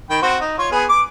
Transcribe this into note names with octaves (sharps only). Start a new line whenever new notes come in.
D#3 G5 B5
C4 F#4 C5
D#4
F4 C#5
B3 G#4
D6